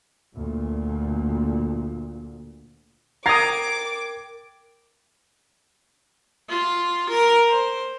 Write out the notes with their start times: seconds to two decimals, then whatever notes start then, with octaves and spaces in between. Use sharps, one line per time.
0.35 D2 A#2
3.26 A#4 G5 A#5 D6 D#6 G#6 A6 C7
6.50 F4
7.10 A#4
7.49 C5